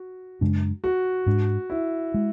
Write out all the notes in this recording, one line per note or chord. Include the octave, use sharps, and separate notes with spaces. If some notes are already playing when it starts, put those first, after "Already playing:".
Already playing: F#4
F#2 C#3 G#3 D4
F#4
G#2 G#3 D4
E4
G#3